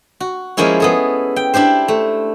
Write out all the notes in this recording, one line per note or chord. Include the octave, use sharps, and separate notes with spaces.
F#4
F3 G#3 A#3 C#4 E4 C#5
B3 G#4 A4
G5
D4 E4 G4 C5
A3